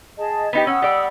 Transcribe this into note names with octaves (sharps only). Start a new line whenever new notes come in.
G#4 D#5 A5
B3 D#4 G4
C#4 F#5 D#6 E6
G3 D5